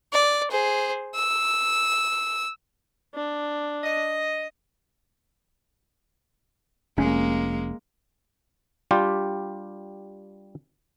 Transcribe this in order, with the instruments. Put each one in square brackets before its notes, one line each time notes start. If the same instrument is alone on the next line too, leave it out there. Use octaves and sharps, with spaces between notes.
[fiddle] D5
G#4 C5
E6
[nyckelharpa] D4
[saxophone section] D#5
[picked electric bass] F1 C#4 [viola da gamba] G#3 A#3
[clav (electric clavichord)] G3 D4 F4 G4